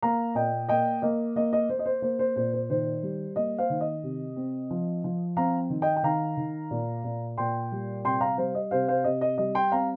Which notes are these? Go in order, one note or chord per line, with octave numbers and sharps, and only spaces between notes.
A#3 F5 A#5
A#2 D#5 G5
A#3 D#5 G5
A#3 D#5
A#3 D#5
D#5
A#3 C5
D#5
C5
A#3 C5
C5
A#2 C5
C5
D#3 C5
G3
A#3 D#5
C5 F5
D#3
D#5
C3
C4
F3
F3
C4 F5 A#5
D#3
D#5 G5
G5
D#3 F5 A#5
D#3
A#2
A#2
A#2 G5 C6
G3
C3 G5 C6
F5 A#5
G3 C5 F5
D#5
C3 C5 F5
C5 F5
C3 D#5
D#5
G3 D#5
G5 C6
C4 F5 A#5